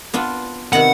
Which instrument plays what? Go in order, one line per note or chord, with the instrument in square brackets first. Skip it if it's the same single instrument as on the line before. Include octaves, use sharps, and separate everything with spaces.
[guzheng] B3 D4 F4
[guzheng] C3 D#3 B3 [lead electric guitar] F#5